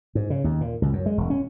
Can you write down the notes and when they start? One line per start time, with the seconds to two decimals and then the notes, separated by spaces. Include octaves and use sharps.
0.15 G#2
0.30 C#3
0.44 D#2
0.61 A#2
0.82 C#2
0.93 F#2
1.06 G#3
1.18 E1
1.30 C#4